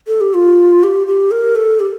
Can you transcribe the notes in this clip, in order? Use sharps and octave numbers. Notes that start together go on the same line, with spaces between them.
A4
G4
F4
G4
G4
A#4
A4
G4